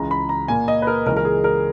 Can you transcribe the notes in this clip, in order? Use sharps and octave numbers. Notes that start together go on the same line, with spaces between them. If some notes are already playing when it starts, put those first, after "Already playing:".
Already playing: C#2 C#3 E3 G#3 A#5
B5
A#5
A#2 A#3 G#5
D#5
B4
A#4
C#2 C#3 E3 A#4
A#4
G#4
A#4